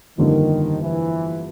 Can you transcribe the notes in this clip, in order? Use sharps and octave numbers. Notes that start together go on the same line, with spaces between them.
G1 F2 D3 D#3 G3 A#3
E3